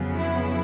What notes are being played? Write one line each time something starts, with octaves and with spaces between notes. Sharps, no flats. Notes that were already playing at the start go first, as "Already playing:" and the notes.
Already playing: F2 C#3 F#3 B3
E4